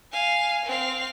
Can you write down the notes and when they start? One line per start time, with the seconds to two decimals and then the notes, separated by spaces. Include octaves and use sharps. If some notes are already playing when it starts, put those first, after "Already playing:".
0.12 F5 G#5
0.65 C4 F5